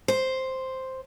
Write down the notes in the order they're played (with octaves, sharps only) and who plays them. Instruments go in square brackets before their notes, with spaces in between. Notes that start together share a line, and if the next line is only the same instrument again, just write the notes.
[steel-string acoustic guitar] C5